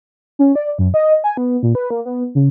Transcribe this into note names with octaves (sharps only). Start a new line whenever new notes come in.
C#4
D5
F#2
D#5
G#5
B3
A#2
B4
A#3
B3
C#3